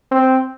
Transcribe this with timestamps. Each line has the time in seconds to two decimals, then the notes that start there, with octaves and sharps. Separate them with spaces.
0.11 C4